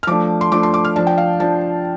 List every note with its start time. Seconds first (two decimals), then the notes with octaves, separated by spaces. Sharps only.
0.03 F6
0.07 F3 A3 D4 D6
0.41 C6
0.52 F3 A3 D4 D6
0.63 C6
0.74 D6
0.85 F6
0.96 F3 D4 A5
1.07 G5
1.18 F5
1.40 F3 D4 A5